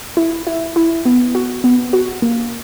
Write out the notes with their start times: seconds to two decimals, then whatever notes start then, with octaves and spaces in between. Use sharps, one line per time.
0.17 E4
0.47 E4
0.76 E4
1.06 B3
1.35 F#4
1.64 B3
1.93 F#4
2.22 A#3